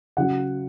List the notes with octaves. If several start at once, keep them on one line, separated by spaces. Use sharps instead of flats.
C#3 F#3 F#5